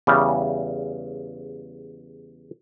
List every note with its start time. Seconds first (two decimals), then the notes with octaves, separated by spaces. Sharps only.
0.07 E2 C#3 G3